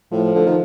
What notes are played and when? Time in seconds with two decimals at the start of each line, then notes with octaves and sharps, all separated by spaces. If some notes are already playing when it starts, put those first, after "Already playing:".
0.12 A2 F3
0.35 D3
0.46 D#3